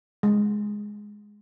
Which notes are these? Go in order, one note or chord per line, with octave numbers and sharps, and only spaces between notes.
G#3